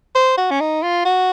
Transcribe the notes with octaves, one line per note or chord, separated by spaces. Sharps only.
C5
F#4
C#4
D#4
F4
F#4